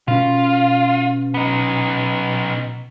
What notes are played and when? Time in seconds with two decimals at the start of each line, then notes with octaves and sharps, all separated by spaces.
0.08 B2 C#4 F4
1.34 B3 D#4